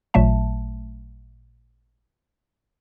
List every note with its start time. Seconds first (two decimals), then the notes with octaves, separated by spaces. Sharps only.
0.14 A1 A#2 F#3 A3 E5 A5